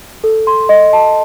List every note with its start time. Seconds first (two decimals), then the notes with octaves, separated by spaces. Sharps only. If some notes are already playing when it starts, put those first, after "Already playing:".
0.24 A4
0.47 C6
0.69 D#5
0.93 A5